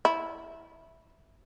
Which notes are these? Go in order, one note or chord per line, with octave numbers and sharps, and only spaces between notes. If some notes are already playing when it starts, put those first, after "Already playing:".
E4